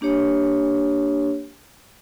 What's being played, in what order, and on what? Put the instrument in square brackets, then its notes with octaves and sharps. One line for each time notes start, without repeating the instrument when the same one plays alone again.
[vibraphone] A#3 D4 G4 C#5